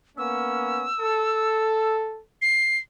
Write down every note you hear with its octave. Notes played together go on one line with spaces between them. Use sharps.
A#3 B3 C#4 E6
A4
C7